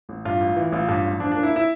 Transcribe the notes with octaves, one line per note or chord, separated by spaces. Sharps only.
A1
G2 F4
A1
E3
A1 F4
G2
A1
F3 D4
D4
A#3
E4
E4